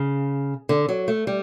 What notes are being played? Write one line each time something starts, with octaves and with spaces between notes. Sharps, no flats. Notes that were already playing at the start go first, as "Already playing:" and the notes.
Already playing: C#3
D3
F#3
A3
G3